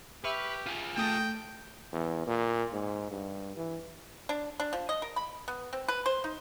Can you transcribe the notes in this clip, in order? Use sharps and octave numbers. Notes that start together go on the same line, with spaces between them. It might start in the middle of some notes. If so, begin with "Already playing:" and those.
G4 B4 E5 C#6 F6
F4 G#4
A3 G5 A5 D#6 A#6
E2
A#2
G#2
G2
E3
D4
D4
F3
D#5
A#4
B5
B3
C4
B4
C5
D#4